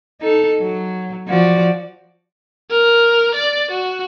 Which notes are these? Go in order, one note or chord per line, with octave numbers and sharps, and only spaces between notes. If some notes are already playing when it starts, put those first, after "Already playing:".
D#4 A4
F#3
F3 F#4 D5
A#4
D5
F#4